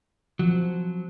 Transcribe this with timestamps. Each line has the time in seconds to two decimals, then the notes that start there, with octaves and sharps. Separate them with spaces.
0.39 F3 F#3